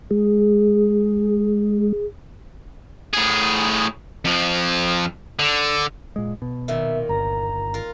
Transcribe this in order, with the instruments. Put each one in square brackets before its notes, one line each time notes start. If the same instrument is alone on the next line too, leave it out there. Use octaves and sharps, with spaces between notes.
[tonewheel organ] G#3 [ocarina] G#4
[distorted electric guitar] A2 G#4
F2 F3
D3
[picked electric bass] A#2 G#3
B2
[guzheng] A#2 D#3 [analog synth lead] E5
[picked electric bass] G1 [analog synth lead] A#5
[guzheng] F4 A#4